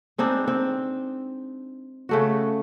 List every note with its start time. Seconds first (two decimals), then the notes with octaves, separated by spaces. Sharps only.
0.18 G#3 C4 D4 D#4
0.48 C4
2.09 C#3 A3 F#4